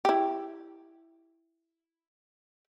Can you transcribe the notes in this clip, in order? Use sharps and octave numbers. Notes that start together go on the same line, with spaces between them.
E4 G4